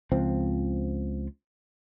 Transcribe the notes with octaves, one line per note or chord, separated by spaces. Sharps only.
C#2 F3 C4